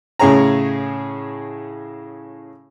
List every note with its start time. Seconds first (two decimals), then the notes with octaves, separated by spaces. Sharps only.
0.19 A2 C#3 G#4 C#5 A#5